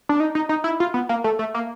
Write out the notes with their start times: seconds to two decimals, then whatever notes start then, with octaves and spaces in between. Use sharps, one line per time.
0.09 D4
0.20 D#4
0.35 D#4
0.49 D#4
0.64 E4
0.80 F4
0.94 B3
1.09 A#3
1.24 A3
1.39 A3
1.54 A#3